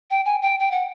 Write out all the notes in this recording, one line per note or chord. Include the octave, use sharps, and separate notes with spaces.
G5
G#5
G5
G5
F#5